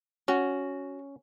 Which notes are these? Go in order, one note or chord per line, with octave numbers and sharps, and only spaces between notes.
C#4 F#4